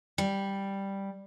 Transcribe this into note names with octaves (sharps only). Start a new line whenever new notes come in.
G3